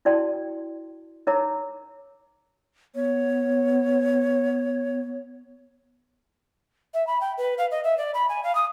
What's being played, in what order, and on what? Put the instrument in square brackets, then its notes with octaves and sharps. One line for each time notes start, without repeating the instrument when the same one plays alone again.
[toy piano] E4 F#4 D5 G5 A5 C6
D#4 A#4 C#5 E5 A#5 D6
[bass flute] B3 [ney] C#5
[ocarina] E5
B5
G5
B4
F5
D#5
E5
D5
B5
G#5
F5
D#6